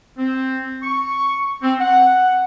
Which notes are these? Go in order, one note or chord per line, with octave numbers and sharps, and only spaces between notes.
C4
C#6
C4
F#5